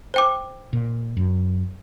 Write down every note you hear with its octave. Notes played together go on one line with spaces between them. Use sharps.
C5 G5 D6
A#2
F#2